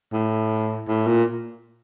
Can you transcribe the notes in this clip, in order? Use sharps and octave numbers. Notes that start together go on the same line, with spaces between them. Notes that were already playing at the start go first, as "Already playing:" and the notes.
A2
A2
A#2